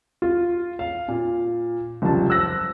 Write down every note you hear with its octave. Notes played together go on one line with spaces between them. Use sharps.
F4
F5
A#2
F#1 C2 F3 A5
E6 F#6 A#6